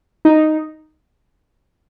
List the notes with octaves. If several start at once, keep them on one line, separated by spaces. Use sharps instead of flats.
D#4